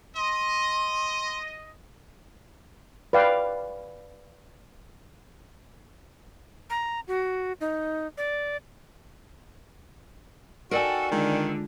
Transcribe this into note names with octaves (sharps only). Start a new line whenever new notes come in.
D#5 C6
B4 D5 F5 G5
A#5
F#4
D#4
D5
D#4 F#4 A4 A#4 D5 D#5 G5 G#5
D3 D#3 G#3 F4 G#4